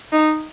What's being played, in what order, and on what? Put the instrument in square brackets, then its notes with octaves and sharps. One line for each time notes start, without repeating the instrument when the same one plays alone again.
[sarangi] D#4